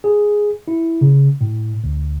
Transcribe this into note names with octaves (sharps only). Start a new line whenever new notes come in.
G#4
E4
C#3
A2
D2